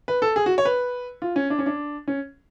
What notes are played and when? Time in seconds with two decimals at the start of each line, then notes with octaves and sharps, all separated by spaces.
0.08 B4
0.22 A4
0.36 G#4
0.46 F#4
0.58 C#5
0.65 B4
1.22 F4
1.36 C#4
1.50 D4
1.59 C#4
1.66 D4
2.08 C#4